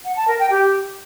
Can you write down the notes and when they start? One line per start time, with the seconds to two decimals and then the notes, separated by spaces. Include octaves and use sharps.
0.04 F#5
0.16 A5
0.28 A#4
0.39 G5
0.51 G4